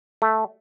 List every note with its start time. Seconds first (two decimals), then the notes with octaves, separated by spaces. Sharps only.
0.22 A3